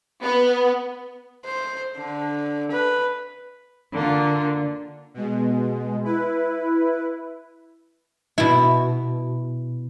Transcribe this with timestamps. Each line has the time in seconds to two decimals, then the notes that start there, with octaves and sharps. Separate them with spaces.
0.22 B3
1.45 C5
1.98 D3
2.71 B4
3.93 D3 A#3 F4
5.14 B2 G#3
6.04 E4 B4
8.38 B2 E4